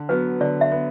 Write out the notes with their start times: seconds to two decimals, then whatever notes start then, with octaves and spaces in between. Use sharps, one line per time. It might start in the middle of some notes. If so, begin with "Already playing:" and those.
Already playing: D3
0.09 F#3 B3 B4
0.40 D3 D5
0.61 E5
0.72 B3